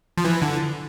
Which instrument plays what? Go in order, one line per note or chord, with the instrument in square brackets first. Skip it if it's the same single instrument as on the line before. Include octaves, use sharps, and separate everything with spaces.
[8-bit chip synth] F3
E3
D3